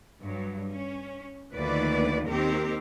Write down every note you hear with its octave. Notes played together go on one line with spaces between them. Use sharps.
G2 F#3
C#4
D2 D#3 F3 A#3 B4 D5
D#2 D#3 C4 G4 A#4